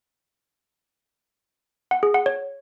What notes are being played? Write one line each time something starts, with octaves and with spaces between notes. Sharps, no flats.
F#5
G#4
F#5
C#5